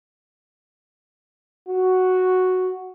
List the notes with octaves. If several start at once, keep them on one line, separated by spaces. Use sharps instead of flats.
F#4